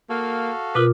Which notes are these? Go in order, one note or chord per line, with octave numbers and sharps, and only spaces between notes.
A#3 F#4 A4 F5
B2 F4 A#4 B4 D6